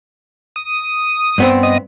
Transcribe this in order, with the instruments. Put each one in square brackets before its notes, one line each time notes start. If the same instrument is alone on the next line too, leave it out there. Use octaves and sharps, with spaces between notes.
[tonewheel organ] D#6
[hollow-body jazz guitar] G2 B3 C4
[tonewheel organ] D#5 D#6